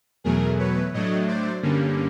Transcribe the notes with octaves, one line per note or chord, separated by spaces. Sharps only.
E2 B2 F#3 A3 G#4 A#4
B4 C#5
A2 F#3 A3 D4 C#5 D#5
C5 D5
G2 D3 G3 A#3 C#4